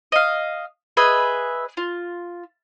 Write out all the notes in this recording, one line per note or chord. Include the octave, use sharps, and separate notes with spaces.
D#5 F5
G#4 B4 D#5 E5
F4